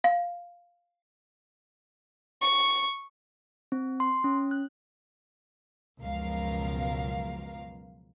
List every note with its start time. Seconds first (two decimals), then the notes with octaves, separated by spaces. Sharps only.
0.04 F5
2.41 C#6
3.72 C4
4.00 C6
4.24 C#4
4.51 F#6
6.01 C#2 F#2 B2 F3 A#4 F5